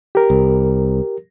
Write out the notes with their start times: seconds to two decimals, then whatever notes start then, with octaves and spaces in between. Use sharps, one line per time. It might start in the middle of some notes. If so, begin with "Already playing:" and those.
0.15 G4 A#4
0.30 C2